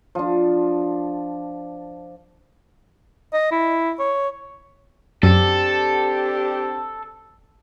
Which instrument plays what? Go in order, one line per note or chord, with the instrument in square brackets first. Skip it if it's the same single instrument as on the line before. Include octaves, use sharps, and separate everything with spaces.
[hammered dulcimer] F3 D4
[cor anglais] D#5
E4
C#5
[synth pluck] F#2 [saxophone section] C4 D4 G4 [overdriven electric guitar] A4